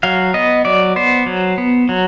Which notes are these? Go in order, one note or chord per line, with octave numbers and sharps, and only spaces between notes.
F#3 F5
B3 D#5
F#3 D5
B3 C5
F#3
B3
F#3